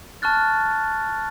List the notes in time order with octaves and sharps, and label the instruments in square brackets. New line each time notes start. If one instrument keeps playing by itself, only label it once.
[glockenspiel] A5 C#6 F6 F#6 A6